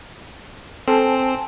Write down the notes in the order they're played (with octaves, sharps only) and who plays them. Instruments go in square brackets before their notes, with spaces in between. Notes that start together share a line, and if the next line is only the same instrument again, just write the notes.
[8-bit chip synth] C4 [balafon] A4 [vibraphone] G#5 A5